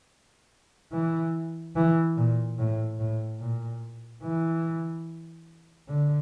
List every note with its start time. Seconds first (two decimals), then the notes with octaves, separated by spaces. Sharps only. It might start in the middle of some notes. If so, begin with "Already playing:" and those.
0.92 E3
1.76 E3
2.17 A#2
2.59 A2
2.99 A2
3.40 A#2
4.23 E3
5.88 D3